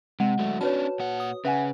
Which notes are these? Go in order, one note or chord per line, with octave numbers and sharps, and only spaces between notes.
C3 G#3 F#5
F#3 A3
C#4 D4 F#4 B4 C#5 A5
A#2 F#5
D#6
C#3 B4 E5 F#5 G#5